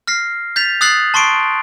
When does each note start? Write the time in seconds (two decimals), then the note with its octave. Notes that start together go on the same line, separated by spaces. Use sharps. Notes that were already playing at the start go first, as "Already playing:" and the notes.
0.07 F6 A#6 C7
0.56 G6 A6 B6 F7
0.81 D#6 E6 F#6 A6 C7 F#7
1.14 A5 C6 C#6 C7 D7